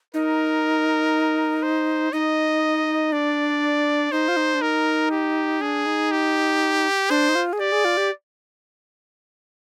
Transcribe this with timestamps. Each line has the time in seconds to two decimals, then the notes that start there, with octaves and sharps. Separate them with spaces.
0.14 D#4 A#4
1.62 C5
2.13 D#4 D#5
3.12 D4 D5
4.12 D#4 C5
4.28 F4
4.37 D#4
4.54 D4
4.61 D#4 A#4
5.11 G4
5.61 D4 G#4
5.86 D#4
6.11 G4
7.10 D4 C5
7.29 D#4
7.35 F4
7.53 G#4
7.60 G4 D5
7.72 G#4
7.85 F4
7.97 G4